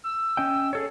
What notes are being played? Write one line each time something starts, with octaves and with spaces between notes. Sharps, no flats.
E6
C#4 D#5 G5
G#4 A4 C#5